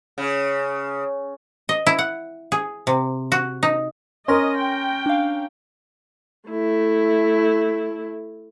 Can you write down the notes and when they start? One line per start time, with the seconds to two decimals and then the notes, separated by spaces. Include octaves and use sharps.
0.18 C#3
1.69 D#5
1.87 E4
1.99 F#5
2.52 G#4
2.87 C3
3.32 F#4
3.63 D#4
4.28 C#4 A#4 D#5 C6 A#6
4.59 G5
5.06 D4 F5
6.49 A3 E4